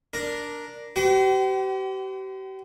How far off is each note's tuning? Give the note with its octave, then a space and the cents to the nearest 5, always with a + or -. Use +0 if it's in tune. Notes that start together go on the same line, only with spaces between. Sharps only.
D4 +0 A#4 +5
G4 -40 C5 -40 F#5 +45